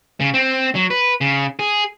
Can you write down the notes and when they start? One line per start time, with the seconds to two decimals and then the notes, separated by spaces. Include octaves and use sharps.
0.20 C#3
0.34 C4
0.75 F#3
0.90 B4
1.21 C#3
1.59 G#4